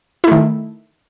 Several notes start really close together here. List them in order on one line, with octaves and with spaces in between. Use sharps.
E4 A3 D#3